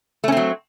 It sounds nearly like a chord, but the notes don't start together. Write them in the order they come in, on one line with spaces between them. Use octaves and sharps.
A3 C#4 C4 F#3